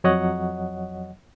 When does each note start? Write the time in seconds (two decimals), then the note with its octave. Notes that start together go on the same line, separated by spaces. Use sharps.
0.04 F2 F#3 C#5 D#5 F#5